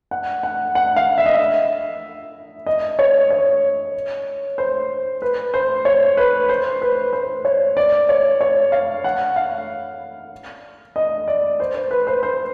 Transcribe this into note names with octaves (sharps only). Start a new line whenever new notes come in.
F#5
F#5
F#5
F5
E5
D#5
E5
D#5
C#5
C#5
C5
B4
C5
C#5
B4
C5
B4
C5
C#5
D5
C#5
C#5
F5
F#5
F5
D#5
D5
C5
C5
B4
C5
C5